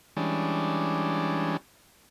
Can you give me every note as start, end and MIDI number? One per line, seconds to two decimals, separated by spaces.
0.17 1.57 52
0.17 1.57 55
0.17 1.57 56
0.17 1.57 61
0.17 1.57 62